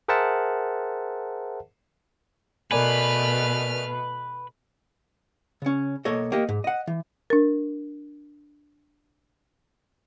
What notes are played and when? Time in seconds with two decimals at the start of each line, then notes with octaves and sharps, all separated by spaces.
0.08 G#4 A#4 C5 E5 F#5 A5
2.72 B2 A3 A#4 B4 D5 G#5 F6
5.62 C#3 C#4
6.05 B1 A#3 A4 C#5 D#5
6.32 A#3 G4 D#5
6.49 G#2
6.64 D#5 F#5
6.87 E3
7.30 D4 A#4